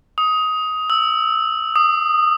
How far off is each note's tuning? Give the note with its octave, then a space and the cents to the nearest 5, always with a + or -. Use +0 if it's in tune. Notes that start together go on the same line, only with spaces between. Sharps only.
D#6 +15
E6 -5
D#6 -15